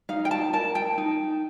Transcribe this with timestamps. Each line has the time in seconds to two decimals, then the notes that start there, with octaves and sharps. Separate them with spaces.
0.09 D#4 F5
0.25 G5
0.31 A5
0.53 A#4 A5
0.75 G5
0.98 D#4